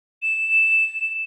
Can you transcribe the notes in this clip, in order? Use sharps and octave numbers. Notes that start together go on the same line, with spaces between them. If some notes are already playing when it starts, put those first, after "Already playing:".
E7